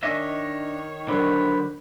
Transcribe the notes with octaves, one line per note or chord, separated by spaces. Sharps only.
D#3 D4 C#5 D#5 E5
D3 F#3 D4 A#4 C5 B5 F#6